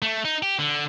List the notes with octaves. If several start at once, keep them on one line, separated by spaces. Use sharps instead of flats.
A3
D#4
G4
D3